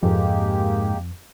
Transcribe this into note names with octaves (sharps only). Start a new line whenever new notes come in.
F2 G#2 G#3 A#3 G4